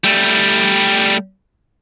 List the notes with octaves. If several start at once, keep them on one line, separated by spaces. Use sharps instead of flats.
G3 A3